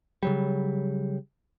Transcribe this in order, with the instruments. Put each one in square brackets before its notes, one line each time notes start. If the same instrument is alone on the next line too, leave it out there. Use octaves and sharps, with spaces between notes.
[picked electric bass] C#3 F#3 G3